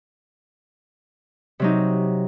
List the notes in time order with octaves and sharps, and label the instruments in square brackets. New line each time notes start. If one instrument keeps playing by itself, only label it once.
[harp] C3 F#3 D#4